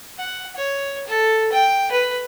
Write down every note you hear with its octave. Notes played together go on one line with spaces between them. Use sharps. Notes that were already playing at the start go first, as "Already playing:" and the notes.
F#5
C#5
A4
G5
B4